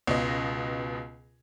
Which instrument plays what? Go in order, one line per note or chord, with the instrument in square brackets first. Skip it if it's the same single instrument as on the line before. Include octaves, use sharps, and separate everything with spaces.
[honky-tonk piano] C#2 B2 D#5